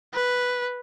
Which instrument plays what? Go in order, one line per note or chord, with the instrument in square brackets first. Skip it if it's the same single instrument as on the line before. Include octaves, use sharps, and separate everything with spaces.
[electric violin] B4